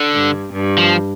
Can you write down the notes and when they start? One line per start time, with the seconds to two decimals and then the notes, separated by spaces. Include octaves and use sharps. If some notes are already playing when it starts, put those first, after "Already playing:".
Already playing: D3
0.15 G2
0.53 G2
0.78 F3